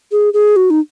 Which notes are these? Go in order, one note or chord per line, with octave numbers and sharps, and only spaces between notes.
G#4
G#4
F#4
D#4